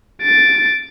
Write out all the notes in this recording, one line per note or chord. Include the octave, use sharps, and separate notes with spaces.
A6 D7